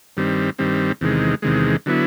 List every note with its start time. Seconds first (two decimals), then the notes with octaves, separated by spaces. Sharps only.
0.17 G2 D#3 G3 C4
0.59 G2 D#3 G3 C4
1.01 E2 C3 D#3 G#3
1.42 E2 C3 D#3 G#3
1.86 D3 F#3 B3 E4